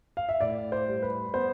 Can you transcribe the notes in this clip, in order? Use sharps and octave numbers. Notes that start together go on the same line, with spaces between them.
F5
E5
A2 D5
C5
G3
B4
B3 C5